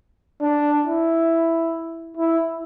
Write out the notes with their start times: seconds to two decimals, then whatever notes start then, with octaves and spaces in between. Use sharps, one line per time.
0.41 D4
0.85 E4
2.17 E4